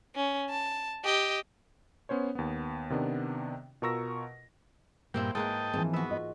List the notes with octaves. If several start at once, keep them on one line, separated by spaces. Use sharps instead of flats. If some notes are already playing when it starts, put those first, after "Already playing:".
C#4
A5
G4 D#5
B3 C#4 C5 C#5
D#2 B3
C3 D#3 B3 D4
B2 F4 A#4 C#6 E6 A#6
G2 A#2 A#3 C4 E4 G5
G#2 A#3 B4 D#5 G5 A5
G#2 E3 F3 C4
B3 F#4 E5
F4 D#5